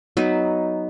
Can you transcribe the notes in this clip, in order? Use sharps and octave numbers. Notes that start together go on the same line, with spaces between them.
F#3 B3 D#4